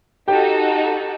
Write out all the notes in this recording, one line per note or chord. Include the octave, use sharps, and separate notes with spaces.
D#4 F#4 G4 A4 G5